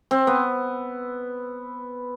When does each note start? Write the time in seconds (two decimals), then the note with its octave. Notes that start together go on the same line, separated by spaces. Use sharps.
0.11 C4
0.27 B3